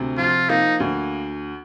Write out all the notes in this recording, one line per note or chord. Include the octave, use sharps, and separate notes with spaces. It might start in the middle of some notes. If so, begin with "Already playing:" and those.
Already playing: D2 C3
F3 F4
A#3 D#4
D2